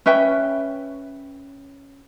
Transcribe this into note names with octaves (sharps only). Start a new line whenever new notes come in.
C#4 B4 E5 G5